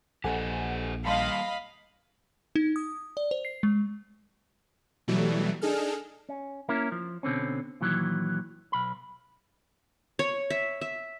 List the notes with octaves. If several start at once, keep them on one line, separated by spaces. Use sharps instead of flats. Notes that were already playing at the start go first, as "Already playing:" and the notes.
A#1 G4 A4 C5 D#5 F#5 G#5
G3 A#3 D#5 F5 A5 B5 C6
D#4
D#6
D5
C5
C7
G#3
B2 E3 F#3 G3 A3
D4 D#4 G#4 A4 F6
C#4
A#3 C#4 E4 A#4
F3
B2 D3 C4 C#4
A#2 D#3 E3 F#3
B1 B5
C#5
E5
E5